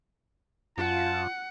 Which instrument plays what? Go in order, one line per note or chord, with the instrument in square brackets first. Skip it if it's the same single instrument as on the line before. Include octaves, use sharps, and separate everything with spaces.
[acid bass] F#2 [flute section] F4 [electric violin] F#5 [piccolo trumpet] A5